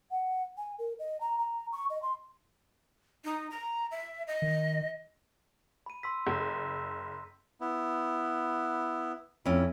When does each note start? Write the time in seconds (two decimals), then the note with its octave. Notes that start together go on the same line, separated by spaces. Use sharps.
0.11 F#5
0.57 G#5
0.79 A#4
0.99 D#5
1.20 A#5
1.38 A#5
1.72 C#6
1.90 D#5
2.02 C6
3.25 D#4
3.51 A#5
3.91 E5
4.27 D#5
4.42 D#3
5.86 B5 D#7
6.03 C6 E6 B6
6.26 F#1
7.61 B3 E4
9.45 F2 C#4 E4